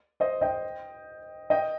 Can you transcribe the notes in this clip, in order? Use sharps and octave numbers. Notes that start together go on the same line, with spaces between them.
C5 D#5
D#5 G5
D#5 G5